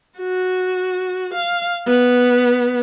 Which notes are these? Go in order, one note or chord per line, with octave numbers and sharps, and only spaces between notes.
F#4
F5
B3